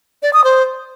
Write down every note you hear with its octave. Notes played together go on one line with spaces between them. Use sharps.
D5
D#6
C5